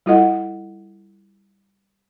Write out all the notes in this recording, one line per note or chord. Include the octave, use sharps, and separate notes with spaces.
G3 E4 F4 A4 D#5 F#5